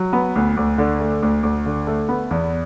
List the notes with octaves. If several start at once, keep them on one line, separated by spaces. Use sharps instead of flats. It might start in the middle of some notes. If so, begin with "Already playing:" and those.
Already playing: F#3
B3
D2
D2
D3
A3
D2
D2
D3
A3
B3
E2